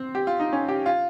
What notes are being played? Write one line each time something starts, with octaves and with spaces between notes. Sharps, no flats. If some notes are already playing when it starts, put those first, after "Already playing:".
Already playing: C4
G4
F4
D#4
C#4
G4
F4